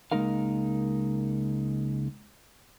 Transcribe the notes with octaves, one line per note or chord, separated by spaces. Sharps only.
C#2 G#3 A#3 D#4 A#4 F5